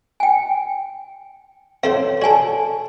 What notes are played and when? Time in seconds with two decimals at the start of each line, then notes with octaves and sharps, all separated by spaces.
0.20 G5 G#5
1.83 C4 A4 C5 C#5 F5
2.22 F#4 A4 D5 G#5 A5